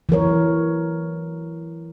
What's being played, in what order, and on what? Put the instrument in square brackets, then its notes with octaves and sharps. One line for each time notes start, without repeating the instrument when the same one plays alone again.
[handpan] E3 F#3 A#4 C#5